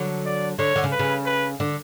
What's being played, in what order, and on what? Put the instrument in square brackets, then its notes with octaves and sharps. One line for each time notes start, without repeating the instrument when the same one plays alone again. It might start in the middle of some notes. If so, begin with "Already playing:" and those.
Already playing: [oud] D3 F#3
[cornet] D5
[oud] D3 [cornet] C#5
[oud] D3
C#3
[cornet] B4
[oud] C#3
[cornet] B4
[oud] D3